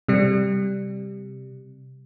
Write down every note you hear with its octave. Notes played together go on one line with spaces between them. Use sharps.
C3 G3